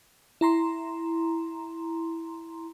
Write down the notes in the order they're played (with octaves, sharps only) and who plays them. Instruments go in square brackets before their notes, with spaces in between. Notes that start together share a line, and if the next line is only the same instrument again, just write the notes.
[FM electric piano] E4 A#5 C6